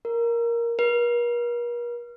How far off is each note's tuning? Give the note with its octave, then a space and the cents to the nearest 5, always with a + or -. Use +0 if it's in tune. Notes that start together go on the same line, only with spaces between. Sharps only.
A#4 +5
A#4 +45